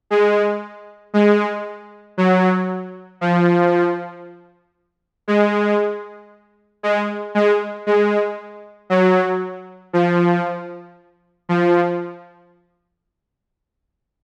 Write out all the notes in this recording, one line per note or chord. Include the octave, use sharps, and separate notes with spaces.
G#3
G#3
F#3
F3
G#3
G#3
G#3
G#3
F#3
F3
F3